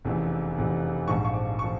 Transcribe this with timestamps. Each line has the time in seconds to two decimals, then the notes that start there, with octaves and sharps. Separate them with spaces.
0.05 F1 E2 C#3
0.57 F1 E2 C#3
1.08 A#1 G#2 F3 C#6
1.25 C#6
1.34 D6
1.59 F3 C#6